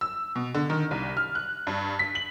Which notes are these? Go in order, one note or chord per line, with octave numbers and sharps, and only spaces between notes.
E6
B2
D3
D#3
C2
F6
F#6
G2
B6
F#7